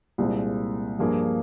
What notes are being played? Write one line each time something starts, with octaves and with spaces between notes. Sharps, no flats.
C2 A#2 G#3 C4
G2 F3 A#3 F4 G#4